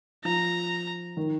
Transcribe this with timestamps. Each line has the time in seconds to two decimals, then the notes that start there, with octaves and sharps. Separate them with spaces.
0.24 F3 A#5
1.17 D#3